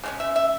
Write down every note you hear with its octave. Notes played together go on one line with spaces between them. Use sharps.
C#3 G#3 C#4
E5
E5